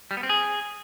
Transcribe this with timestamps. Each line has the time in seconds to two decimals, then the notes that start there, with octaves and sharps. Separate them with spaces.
0.11 G3
0.17 B3
0.23 C4
0.29 G#4